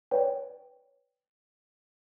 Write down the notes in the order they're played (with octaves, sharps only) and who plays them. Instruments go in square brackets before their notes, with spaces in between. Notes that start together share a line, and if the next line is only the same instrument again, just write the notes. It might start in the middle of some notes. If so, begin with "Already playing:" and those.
[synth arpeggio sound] B4 C#5 D5 G5